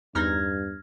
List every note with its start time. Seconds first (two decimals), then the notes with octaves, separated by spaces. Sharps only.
0.15 E2 G2 D#4 F6 G#6 A#6